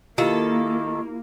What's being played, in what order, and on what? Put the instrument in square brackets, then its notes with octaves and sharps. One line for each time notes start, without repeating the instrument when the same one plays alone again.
[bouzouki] D#3 A4 [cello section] A#3 [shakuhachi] E4 [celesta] F4 G4 F5